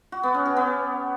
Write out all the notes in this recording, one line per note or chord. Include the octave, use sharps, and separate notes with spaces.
F#4
B3
C#4
G4
B3